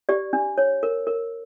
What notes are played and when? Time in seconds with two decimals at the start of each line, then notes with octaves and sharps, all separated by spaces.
0.09 G4 D5
0.33 D4
0.58 C#5
0.83 A#4
1.07 A#4